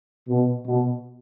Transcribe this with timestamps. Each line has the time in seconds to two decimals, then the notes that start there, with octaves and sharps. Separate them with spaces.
0.28 B2
0.67 B2